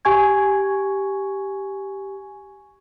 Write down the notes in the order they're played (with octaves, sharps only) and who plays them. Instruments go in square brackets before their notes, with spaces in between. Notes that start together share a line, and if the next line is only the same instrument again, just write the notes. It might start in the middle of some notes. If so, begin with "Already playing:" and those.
[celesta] G4 G#5 C#6 G#6